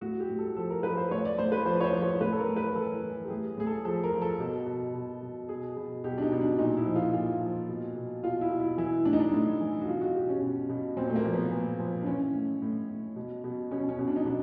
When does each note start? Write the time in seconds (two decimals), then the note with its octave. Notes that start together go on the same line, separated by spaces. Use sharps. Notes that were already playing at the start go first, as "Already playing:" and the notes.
0.01 A2 F#4
0.20 G4
0.29 A2
0.39 A4
0.56 F3 A4
0.70 A#4
0.83 F3 B4
0.97 C5
1.11 A2 C#5
1.25 D5
1.38 A2 C5
1.52 B4
1.66 F3 C5
1.81 C#5
1.84 C5
1.93 F3
2.02 C#5
2.20 A2 B4
2.32 A4
2.39 A#4
2.48 A2
2.56 B4
2.68 A#4
2.75 E3 A4
3.03 E3
3.25 G4
3.30 A2 G#4
3.57 A2 G#4
3.67 A4
3.85 F3 A4
4.03 A#4
4.12 F3
4.22 A4
4.40 B2
4.67 B2
4.95 B2
5.22 B2
5.49 B2 G#4
5.77 B2
6.04 B2 G4
6.18 D4
6.22 D#4
6.32 B2
6.41 D4
6.59 A#2 D#4
6.77 E4
6.86 F3
6.95 F4
7.13 A#2 F4
7.41 F3
7.69 B2
7.96 B2
8.23 B2 F4
8.41 E4
8.50 B2
8.60 E4
8.78 E3 E4
9.05 A2 D4
9.13 D#4
9.20 D4
9.32 A2
9.61 E3
9.81 F#4
9.88 B2 F4
10.01 F#4
10.14 B2 G4
10.29 C#4
10.42 B2
10.69 B2
10.97 A#2 C4
11.09 A3
11.16 A#3
11.25 F3
11.33 B3
11.52 A#2
11.80 F3
12.02 D4
12.06 E3 C#4
12.34 A2
12.62 A2
12.89 A2
13.16 B2
13.44 B2
13.71 B2 C#4
13.89 C#4
13.99 B2
14.08 D4
14.16 D#4
14.26 B2 D4